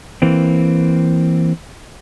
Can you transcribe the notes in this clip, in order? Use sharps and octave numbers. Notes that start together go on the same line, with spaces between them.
E3 A#3 C4